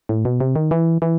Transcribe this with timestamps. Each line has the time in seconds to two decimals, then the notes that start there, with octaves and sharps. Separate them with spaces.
0.09 A2
0.25 B2
0.40 C3
0.56 D#3
0.71 E3
1.02 E3